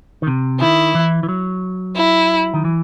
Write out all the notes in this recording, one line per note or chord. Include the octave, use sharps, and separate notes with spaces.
D#3
C3
D#3 E4
E3
E3
F#3
E4
D#3
E3